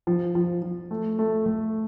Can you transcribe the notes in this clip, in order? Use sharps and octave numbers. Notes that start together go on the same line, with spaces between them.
F3
F3
F3
A3
A3
A3